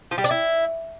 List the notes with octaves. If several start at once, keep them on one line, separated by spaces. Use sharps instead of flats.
F3
G3
D4
E4